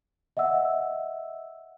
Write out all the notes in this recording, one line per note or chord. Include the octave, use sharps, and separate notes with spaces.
D#5 E5 F#5 E6